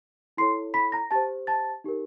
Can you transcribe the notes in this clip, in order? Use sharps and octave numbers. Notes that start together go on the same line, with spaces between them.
E4 A4 C#5 C6 C7
B5 B6
A#5 A#6
G4 C5 A5 A6
A5 A6
D#4 G4 A#4